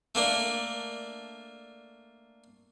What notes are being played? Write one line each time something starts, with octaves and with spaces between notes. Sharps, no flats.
A3 A#3 D4